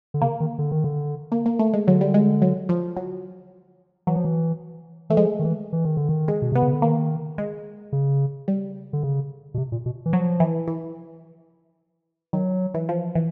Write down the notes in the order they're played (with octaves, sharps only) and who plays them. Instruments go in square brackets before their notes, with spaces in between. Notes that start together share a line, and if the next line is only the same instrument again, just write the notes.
[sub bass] D3
[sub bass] C#3 [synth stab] A#3
[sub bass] D#3
D3
D#3
D3
[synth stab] A#3
A#3
A3
G#3
[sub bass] D3 [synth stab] F#3
[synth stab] G3
G#3
F#3
F3
F#3
[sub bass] E3 [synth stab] F#3
[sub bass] F3
E3
[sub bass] E3 [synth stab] A3
[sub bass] F3 [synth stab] G#3
[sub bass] D#3
E3
E3
D#3
D3
D#3
[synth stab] G#3
[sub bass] B2
[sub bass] C3 [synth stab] B3
[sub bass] C#3
D3
[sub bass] D#3 [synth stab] A#3
[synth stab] G#3
[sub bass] C#3
[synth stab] G3
[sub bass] D3
C#3
B2
C3
A#2
B2
E3
[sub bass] F3 [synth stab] F#3
[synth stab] E3
E3
[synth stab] D#3 [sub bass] F#3
[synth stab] E3
F3
E3